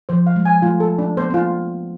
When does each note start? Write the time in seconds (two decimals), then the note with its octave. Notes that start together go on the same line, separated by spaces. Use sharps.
0.09 F3 C5
0.27 F5
0.36 G#3
0.45 G#5
0.62 A3 F4
0.80 A4
0.98 D4
1.17 B3 C5
1.30 C4 F4